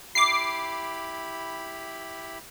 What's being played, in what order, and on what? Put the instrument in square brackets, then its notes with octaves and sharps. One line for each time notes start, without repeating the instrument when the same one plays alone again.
[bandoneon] E4 G4 B5 [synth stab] D6 C7